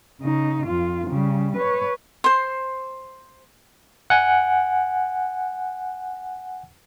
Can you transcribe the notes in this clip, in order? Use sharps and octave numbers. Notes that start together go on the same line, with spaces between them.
C#3 D#4
F2 F4
C#3 G3
B4 C#5
C5 C6
F#5 G#5